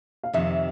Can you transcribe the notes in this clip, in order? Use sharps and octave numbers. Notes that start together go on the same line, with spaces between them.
F5
F2 C3 D#3 E5